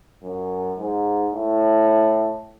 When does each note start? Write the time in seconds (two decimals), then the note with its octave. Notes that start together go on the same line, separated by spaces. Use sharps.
0.23 F#2
0.78 G#2
1.34 A2